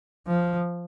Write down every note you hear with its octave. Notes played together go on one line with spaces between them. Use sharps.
F3